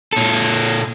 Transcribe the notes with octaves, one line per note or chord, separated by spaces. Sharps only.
A#2 A4